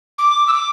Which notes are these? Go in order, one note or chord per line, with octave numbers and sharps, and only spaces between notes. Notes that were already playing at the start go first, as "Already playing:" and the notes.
D6
E6
D6